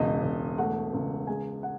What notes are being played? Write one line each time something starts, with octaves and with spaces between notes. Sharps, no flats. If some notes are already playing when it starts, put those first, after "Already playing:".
Already playing: E1 C#2 D#5
E1
A3 F#5
C#2
G#3 G#5
F#5